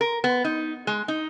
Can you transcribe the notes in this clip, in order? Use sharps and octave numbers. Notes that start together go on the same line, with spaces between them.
A#4
B3
D#4
G#3
D#4